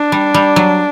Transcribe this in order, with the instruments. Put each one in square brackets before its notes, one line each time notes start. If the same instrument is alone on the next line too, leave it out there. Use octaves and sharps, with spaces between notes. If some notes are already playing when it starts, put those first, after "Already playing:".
Already playing: [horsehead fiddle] D4
[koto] G3
G3
F#3